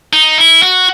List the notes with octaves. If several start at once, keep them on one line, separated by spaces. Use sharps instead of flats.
D#4
E4
F#4